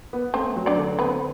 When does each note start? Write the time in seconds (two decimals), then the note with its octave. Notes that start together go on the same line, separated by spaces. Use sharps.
0.13 B3
0.34 A3 C4 C5
0.56 F#3
0.66 D4 D5
0.77 D3
0.99 B3 C4 B4